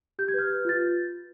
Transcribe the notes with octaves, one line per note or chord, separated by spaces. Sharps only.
G4 G6
G#6
B4 F6 G6
B4
F4 A6